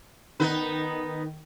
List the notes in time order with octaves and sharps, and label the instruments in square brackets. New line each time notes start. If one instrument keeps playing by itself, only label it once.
[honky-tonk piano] D#3 [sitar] B3 D#4 B4